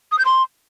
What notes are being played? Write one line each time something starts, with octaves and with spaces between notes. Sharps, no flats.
D#6
G6
C6